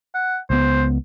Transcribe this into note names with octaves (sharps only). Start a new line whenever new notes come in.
F#5
C#2 B3 C5